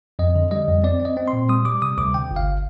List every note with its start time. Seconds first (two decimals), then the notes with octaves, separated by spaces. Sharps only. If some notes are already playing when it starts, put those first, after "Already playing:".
0.19 F2 D#5
0.36 D3
0.51 G3 D#5
0.68 F2
0.84 C4 D5
1.00 C4
1.05 D#5
1.17 C4
1.28 C6
1.33 A#2
1.49 G3 D#6
1.65 G3 D6
1.82 C3 D#6
1.98 D2 D6
2.14 D3 G5
2.31 G1
2.36 F5